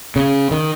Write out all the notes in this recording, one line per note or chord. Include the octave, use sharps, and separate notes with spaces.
C#3
D#3